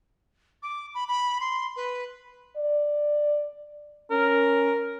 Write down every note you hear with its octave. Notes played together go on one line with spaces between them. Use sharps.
D6
B5
B5
C6
B4
D5
C#4 A#4